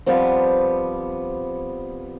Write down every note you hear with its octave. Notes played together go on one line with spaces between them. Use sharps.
F3 G3 B3 C4